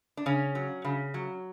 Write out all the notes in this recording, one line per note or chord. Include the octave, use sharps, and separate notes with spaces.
D4
C#3 C#4
F#3
C#3
F#3